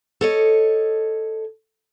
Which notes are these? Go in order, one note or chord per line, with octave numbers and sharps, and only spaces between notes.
A4 C#5 D#5